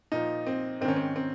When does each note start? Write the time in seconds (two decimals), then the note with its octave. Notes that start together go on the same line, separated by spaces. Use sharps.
0.12 A#2 F3 D#4
0.47 C4
0.81 G#2 C4
0.85 D#3 C#4
0.96 C4
1.16 C4